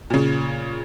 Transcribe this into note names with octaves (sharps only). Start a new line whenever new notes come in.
A#2 C#3